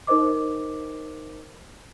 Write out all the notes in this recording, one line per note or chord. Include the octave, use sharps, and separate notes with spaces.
D#4 A#4 C5 D#5 D6